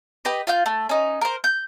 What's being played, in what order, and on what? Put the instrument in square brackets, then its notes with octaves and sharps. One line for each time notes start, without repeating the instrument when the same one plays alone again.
[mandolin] G4 B4 D#5
F4 F5 G6
A3
C#4 D#4
A#4 C5
G6